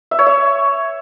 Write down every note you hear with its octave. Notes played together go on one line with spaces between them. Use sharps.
E5
C#5
E5